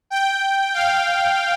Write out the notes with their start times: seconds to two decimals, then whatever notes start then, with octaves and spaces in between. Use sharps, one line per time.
0.10 G5
0.74 F5